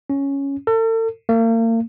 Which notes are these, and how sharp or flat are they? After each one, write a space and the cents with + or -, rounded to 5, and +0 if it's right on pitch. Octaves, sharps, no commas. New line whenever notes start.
C#4 +0
A4 +40
A#3 -40